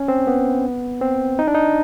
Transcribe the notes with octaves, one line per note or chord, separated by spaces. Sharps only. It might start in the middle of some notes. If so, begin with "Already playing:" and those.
Already playing: C#4
C4
B3
C4
D#4
D4
D#4